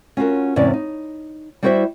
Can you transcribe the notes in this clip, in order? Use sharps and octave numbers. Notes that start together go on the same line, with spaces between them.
C#4 F4 F#4 A#4
E2 G#2 C3 C#4 D5
D#4
G3 E4 F#4 C5 D#5 E5